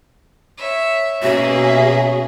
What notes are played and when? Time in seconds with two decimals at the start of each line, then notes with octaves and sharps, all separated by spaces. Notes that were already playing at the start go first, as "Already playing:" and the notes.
0.58 C#5 E5
1.22 B2 A#3 C#4 F#4 G#4 E5